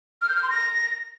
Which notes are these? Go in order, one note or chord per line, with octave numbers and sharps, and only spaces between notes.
F6
G6
F6
C6
A#6